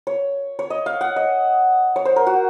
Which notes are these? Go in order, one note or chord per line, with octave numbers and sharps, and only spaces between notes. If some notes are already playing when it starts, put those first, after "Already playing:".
C#5
C#5
D#5
F5
F#5
D#5
C#5
C5
A#4
F#4